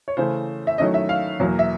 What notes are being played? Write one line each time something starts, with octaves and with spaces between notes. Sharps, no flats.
C#5
C#3 E3 A3 C#4 C5
E5
D#3 F#3 A3 C#4 E4 D#5
E5
F5
E2 B2 F#3 A#3
E5